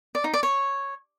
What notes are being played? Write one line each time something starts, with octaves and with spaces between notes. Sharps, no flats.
D5
D#4
D5
C#5